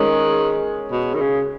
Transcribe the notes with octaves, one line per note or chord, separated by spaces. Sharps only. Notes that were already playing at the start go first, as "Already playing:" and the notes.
Already playing: D#3 G#3 C#4
B2
D#3
C#3